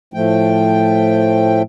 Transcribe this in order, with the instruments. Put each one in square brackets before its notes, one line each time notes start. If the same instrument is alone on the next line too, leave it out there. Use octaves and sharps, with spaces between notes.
[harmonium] A2 F3 A3 G5